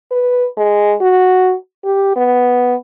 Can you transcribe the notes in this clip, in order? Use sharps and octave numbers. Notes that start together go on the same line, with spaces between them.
B4
G#3
F#4
G4
B3